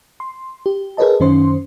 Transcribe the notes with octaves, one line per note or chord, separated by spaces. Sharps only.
C6
G4
G#4 A#4 B4 C#5 D#5 A5
F#2 D#3 C#4 C5 C6